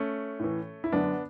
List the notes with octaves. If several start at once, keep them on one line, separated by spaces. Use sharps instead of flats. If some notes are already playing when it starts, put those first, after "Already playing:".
Already playing: A3 C#4
A2 E3
E4
F#2 D3 B3 D4